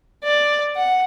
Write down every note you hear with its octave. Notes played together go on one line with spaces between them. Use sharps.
D5
F#5